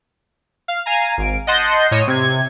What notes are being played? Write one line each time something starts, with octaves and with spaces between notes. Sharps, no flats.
F5
F5 G#5 A#5
G#1 D7
D#5 F#5 A5 C6 G6
A2 C#5 D#5 D#7 E7
C3 G#6